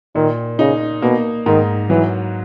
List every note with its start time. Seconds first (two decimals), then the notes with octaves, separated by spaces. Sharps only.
0.15 A#2 D#3
0.59 C#3 D#4
1.02 B2 A#3
1.46 G#2 D#3
1.89 E3 F#3